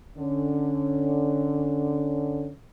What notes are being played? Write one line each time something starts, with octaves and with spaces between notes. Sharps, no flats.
D3 C#4